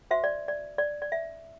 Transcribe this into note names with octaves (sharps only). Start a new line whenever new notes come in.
F#4 C5 E5
D5
D5
D5
D5
E5